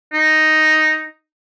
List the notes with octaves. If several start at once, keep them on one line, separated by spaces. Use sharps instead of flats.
D#4